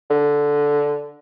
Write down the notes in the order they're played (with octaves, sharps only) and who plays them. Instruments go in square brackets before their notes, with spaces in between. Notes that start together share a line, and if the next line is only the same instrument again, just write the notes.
[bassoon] D3